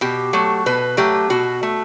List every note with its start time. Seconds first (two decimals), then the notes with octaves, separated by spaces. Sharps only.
0.01 B2 G4
0.33 F#3 A3
0.66 B2 B4
0.97 F#3 A3 G4
1.30 B2 F#4
1.63 A3